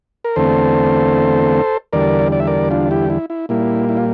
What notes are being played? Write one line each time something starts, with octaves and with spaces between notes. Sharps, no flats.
A#4
E2 D3 A3 C4 A4 C5
E2 D3 G3 A#4 D5
D5
E5
A#4 D5
D4 F4
E4 G4
E4
E4
A#2 G3 A#3 E4
E4
F4